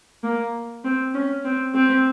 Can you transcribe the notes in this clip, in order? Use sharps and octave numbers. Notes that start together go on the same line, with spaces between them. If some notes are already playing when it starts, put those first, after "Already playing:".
A#3
C4
C#4
C4
C4